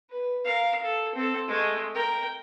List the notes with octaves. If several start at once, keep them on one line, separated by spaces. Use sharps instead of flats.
B4
A#4 F5
A4
C4 A4
G#3 A3
A#4 G5